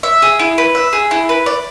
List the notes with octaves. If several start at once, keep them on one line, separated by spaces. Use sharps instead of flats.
E5
G#4
E4
B4
E5
G#4
E4
B4
D5